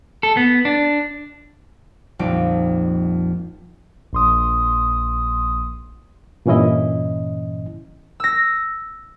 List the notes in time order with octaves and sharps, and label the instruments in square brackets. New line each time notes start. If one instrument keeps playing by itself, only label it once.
[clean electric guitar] A4
B3
D4
[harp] A#1 F2 G3 D#4 D7
[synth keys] A#1 C6 D#6
[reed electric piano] G2 A#2 E3 C#4 E4 D#5
[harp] E6 A#6